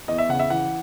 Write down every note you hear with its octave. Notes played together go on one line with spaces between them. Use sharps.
E2 D#5
E5
C#3 F#5
E5
E3 F#5